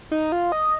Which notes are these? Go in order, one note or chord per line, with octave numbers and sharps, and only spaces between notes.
D#4
F4
D#5